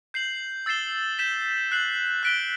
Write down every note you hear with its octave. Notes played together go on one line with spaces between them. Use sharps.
G6 C7 F#7
E6 A6 C7 E7 G7
G6 B6 E7
F#6 C7 F#7
F#6 B6 D7 G7